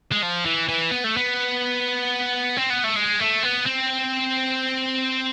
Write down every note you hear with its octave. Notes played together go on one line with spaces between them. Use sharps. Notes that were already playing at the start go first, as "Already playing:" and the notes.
G#3
F3
E3
E3
B3
A3
B3
C4
B3
A3
G#3
A3
B3
C4